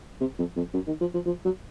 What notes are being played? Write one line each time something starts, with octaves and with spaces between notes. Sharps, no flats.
C3
F2
F2
F#2
D#3
F3
F3
F3
F#3